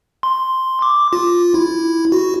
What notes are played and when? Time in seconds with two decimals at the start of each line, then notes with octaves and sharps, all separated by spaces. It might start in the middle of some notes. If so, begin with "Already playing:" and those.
0.23 C6
0.82 D6
1.13 F4
1.54 E4
2.12 F#4